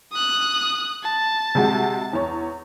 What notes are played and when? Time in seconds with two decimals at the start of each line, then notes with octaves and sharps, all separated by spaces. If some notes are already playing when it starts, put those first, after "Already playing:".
0.12 D#6 F#6
1.03 A5
1.55 C3 G#3 F#4
2.13 E2 C#5